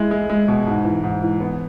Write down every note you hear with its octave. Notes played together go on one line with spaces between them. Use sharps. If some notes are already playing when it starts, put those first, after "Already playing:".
Already playing: G#3 E4
G#3
G#3
B2
G#2
E3
G#2
E3
B3